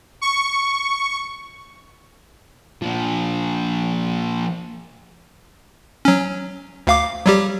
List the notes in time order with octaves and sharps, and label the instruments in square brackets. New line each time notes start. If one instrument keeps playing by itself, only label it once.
[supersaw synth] C#6
[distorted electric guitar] A#2 F3
[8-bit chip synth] F#3 C#4
D2 F5 D6
F#3 G3 G4